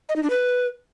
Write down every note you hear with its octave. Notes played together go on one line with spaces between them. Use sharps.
D#5
D#4
D4
B4